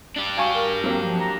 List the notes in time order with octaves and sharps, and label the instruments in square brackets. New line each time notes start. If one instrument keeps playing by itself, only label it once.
[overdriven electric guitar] D4 G4
[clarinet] F#4 [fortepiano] F5 G#5 C#6
[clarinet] A#4
[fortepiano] F#3 A#3 [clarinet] C4
[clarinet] F3
A#5